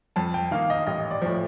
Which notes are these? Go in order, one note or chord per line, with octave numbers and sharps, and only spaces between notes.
F2 A5
G5
D#3 A#3 D#4 F5
D#5
A1 D#5
D5
A2 F3